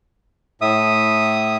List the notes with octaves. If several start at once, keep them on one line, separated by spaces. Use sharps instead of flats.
A2 E5 D#6